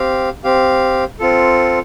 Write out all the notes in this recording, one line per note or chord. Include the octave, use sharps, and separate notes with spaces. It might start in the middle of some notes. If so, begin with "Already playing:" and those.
Already playing: C4 G4 F5
C4 G4 F5
C4 F4 A4